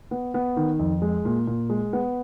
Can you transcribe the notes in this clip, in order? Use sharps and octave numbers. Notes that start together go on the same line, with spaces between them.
B3
B3
D#3
F2
G#3
A#2
A#2
G#3
B3